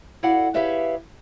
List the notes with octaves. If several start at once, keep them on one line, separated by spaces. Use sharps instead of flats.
E4 F#4 A4 D5 F5 F#5
G4 G#4 B4 C#5 E5 F5